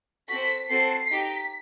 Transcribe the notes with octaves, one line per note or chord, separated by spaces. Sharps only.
C4 F#4 A4 B6
C4 F#4 A4 C7
D#4 G4 B6